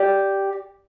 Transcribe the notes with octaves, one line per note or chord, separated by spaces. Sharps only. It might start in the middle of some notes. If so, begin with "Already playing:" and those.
Already playing: G4 D5